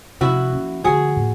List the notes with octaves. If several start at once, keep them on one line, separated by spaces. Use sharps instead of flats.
C3 F3 A3 C#4 E4 F#4
F3 A#3 C#4
D3 F3 A3 F#4 G#4
A2 F3 A#3